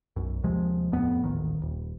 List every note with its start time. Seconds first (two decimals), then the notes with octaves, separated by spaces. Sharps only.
0.16 B1 F#2
0.44 D#2 C3 F3 G#3
0.92 D#1 F2 A2 B3
1.24 D#1 A1 D#2 D#3
1.62 D#1